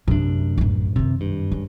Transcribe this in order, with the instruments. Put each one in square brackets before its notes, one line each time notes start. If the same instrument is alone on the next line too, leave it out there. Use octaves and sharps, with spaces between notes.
[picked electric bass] F#2 D4 [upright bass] C3 A3
[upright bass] A1 D2
[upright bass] F#2 D#3 [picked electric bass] C3
[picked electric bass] G2
[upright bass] C#3